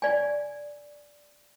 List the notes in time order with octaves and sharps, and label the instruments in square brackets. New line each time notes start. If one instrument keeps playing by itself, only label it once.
[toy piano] D5 G#5